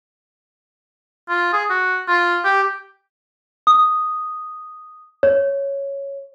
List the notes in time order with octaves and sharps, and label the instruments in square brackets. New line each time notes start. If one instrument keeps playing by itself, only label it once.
[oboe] F4
G#4
F#4
F4
G4
[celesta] D#6
C#5